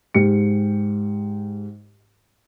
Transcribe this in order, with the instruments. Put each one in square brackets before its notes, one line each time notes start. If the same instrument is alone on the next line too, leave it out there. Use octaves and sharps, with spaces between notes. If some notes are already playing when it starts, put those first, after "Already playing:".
[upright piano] G#2 G4 C#7